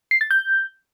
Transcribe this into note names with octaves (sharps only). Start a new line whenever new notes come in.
C7
A6
G6